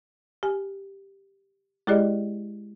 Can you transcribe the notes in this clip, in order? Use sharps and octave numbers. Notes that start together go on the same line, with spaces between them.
G4 G#5
G#3 E4 G4 G#4 D5 D#5